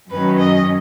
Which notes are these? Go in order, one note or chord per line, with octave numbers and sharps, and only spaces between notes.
F#2 D#3 F#3 C#4 B4
D#5